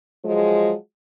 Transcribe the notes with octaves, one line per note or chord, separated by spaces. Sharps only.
F3 F#3 G#3